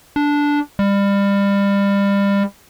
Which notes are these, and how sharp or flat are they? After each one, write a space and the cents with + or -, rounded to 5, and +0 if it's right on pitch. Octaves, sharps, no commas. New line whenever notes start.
D4 -10
G3 +30